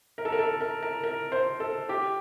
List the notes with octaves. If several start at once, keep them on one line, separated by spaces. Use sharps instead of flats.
A#4
A4
A#4
A4
A#4
A#4
A#4
C5
A4
G4